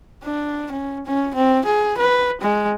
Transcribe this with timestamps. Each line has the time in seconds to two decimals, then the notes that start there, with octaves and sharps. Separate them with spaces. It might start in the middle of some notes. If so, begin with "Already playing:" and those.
0.23 D4
0.72 C#4
1.06 C#4
1.34 C4
1.65 G#4
1.97 B4
2.41 G#3